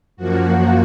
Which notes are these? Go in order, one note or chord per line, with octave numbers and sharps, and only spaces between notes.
F#2 F3 A#3 F#4